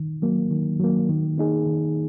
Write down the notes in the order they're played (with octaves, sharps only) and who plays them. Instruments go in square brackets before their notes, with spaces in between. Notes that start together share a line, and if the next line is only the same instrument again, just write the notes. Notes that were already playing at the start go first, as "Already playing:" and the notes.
Already playing: [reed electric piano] D#3
F#3 A#3
D#3
F#3 A#3
D#3
A#3 D#4 G#4
D#3